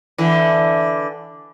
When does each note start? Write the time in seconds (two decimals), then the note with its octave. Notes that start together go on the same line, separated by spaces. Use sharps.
0.18 D3 E3